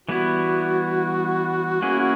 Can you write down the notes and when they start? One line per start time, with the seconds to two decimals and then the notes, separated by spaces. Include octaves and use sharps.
0.08 E3 G3 B3 E4 F#4
1.82 A#3 C#4 E4 G#4